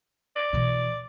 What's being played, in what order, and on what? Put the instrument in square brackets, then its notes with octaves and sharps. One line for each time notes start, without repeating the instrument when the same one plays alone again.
[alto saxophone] D5
[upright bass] B2 E3